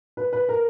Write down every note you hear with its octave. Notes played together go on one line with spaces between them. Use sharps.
B4
B4
A#4